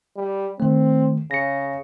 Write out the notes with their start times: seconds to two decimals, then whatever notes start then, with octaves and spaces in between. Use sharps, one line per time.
0.17 G3
0.60 D#3 A3 C4
1.31 C#3 A#6 C#7